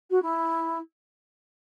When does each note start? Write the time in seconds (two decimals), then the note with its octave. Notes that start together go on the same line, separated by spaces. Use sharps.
0.10 F#4
0.22 E4